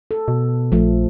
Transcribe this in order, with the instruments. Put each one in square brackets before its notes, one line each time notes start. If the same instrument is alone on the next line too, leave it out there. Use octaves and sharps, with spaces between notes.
[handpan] A4
[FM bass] B2
[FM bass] A#1 [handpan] F3 A3